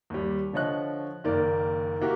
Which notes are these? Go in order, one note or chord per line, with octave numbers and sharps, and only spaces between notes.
D#2 G3
D3 F3 C#5 D#5 F#6
F#1 D#3 A#3 A#4 D5
A#3 E4 F#4 G4